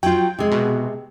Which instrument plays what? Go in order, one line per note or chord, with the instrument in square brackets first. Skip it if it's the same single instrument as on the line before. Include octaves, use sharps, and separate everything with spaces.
[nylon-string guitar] F#3 F4 [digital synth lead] G5
[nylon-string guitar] C3 G#3
[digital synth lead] B2